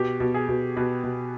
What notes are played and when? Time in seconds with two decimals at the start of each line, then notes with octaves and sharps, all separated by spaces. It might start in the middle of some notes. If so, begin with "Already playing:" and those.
Already playing: B2 G4
0.20 B2
0.34 G#4
0.48 B2
0.76 B2 B4
1.04 B2